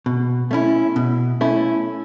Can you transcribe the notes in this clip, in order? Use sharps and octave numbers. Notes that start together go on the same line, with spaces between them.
B2
A3 C#4 E4
B2
A3 C#4 E4